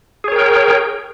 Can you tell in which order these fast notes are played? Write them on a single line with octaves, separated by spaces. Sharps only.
G#4 C#5 A#4 G5